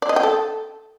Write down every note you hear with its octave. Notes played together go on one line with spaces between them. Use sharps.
D5
D#5
G5
A4